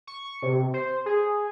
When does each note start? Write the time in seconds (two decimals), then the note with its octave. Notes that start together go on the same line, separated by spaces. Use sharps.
0.07 C#6
0.42 C3
0.74 C5
1.06 G#4